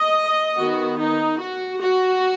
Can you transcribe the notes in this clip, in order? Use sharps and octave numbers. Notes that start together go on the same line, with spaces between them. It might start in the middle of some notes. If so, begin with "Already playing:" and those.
Already playing: D#5
D#3 B3 F#4
D#4
F#4
F#4